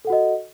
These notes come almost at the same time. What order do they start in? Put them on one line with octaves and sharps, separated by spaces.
A4 F#5 F#4 D#5